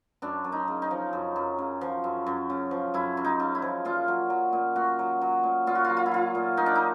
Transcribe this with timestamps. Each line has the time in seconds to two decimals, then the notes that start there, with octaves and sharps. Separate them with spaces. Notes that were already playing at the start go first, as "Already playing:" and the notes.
0.22 F#2 D4
0.44 F#2
0.52 D#4
0.68 C#3
0.82 D#4
0.91 F3
1.13 F#2
1.36 F#2
1.59 C#3
1.81 F3
2.04 F#2
2.27 F#2
2.50 C#3
2.71 F3
2.94 F#2 E4
3.17 F#2
3.25 D#4
3.40 C#3
3.55 E4
3.62 F3
3.85 A#2 F4
4.08 F#3
4.30 F#3
4.53 A#2
4.76 A#2 F#4
4.99 F#3
5.21 F#3
5.44 A#2
5.67 A#2 F4
5.75 F#4
5.84 F4
5.90 F#3
5.97 F4
6.06 E4
6.11 F#3 F4
6.35 A#2
6.57 A#2 D#4
6.66 D4
6.75 D#4